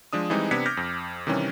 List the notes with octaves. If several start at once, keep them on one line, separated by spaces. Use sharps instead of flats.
F3 G#3 D4 D#6
E3 G3 G#3 C4 D#4
C3 B3 D4 G#6 B6 C#7
D6 F6 G6 A#6
F2
C3 D#3 E3 G3 C#4